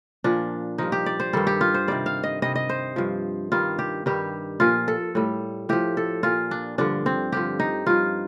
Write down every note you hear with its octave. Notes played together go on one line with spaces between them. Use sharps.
A#2 F3 D4
G2 F3 D#4
G4
D5
C5
G2 D#3 G3 A4
G4
F4
C5
C3 D#3 G3 D5
F5
D#5
C3 G3 D#5
D#5
C5
G2 F3
G2 D#3 G3 F4
G4
G2 D#3 G3 G4
A#2 F3 F4
A4
A2 G3
A2 F3 G4
A4
A#2 F3 F4
D4
G2 D3 F3 D4
C4
G2 D3 F3 G4
D#4
G2 F3 F4